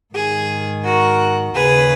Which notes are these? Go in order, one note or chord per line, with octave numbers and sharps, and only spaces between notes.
G#2 D#3 G#4
F#4 A#4
D#2 C#3 G#4 B4